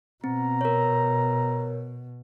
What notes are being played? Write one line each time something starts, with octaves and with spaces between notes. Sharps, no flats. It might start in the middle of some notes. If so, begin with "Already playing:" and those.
B2 C4 A#5
A#4 C#5